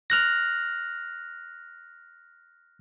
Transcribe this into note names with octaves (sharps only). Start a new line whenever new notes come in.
F6 F#6 A#6